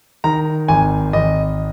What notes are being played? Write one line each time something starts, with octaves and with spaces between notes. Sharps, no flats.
D#3 A#5
G#1 G#5
G#1 D#5